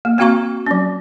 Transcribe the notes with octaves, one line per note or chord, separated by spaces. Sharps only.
A#3
A#3 C4 F#4 F5 A#5 C#6
F#3 C#4